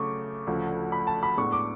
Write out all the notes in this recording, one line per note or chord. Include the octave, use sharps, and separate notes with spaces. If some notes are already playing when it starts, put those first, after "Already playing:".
Already playing: C#3 F#3 A3 C#6 D6
D2 C#3 F3 A3
B5
A5
B5
A2 G#3 B3 D4 C#6
D6